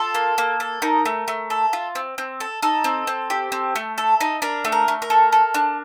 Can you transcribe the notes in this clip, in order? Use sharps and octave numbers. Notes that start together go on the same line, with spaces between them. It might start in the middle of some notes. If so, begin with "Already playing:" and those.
Already playing: F4 A4
A#3
A#3
A4
D#4 A#4
A3
A3
A4
F4
C4
C4
A4
D#4 A4
C4
C4
G4
C4
A3
A4
D#4
D4 A#4
A3
A#4
A3
A#4
A4
A4
D4